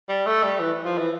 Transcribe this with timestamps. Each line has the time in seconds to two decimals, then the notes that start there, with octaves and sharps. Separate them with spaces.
0.09 G3
0.26 A3
0.43 G3
0.60 E3
0.85 F3
0.98 E3